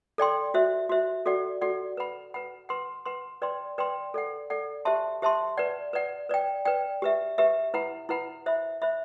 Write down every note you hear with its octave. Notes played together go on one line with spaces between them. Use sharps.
A4 D5 G5 C6
F#4 C5 E5
F#4 C5 E5
F#4 A4 D5 F#5
F#4 A4 D5 F#5
B4 F#5 B5
B4 F#5 B5
B4 F#5 C6
B4 F#5 C6
B4 D5 G5 C6
B4 D5 G5 C6
A4 D5 F#5
A4 D5 F#5
G4 C5 E5 A5 C6
G4 C5 E5 A5 C6
B4 D5 F#5
B4 D5 F#5
B4 D5 G5
B4 D5 G5
G4 B4 E5
G4 B4 E5
E4 B4 F#5 B5
E4 B4 F#5 B5
C5 E5 B5
C5 E5 B5